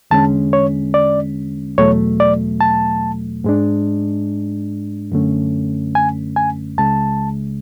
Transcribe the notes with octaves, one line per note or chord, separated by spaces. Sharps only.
E2 D3 G#3 C#4 A5
C#5
D5
E2 B2 F#3 A3 C#5
D5
A5
G#2 G#3 D4
F#2 D3 A3 C#4
G#5
G#5
C#2 C#3 G#3 A5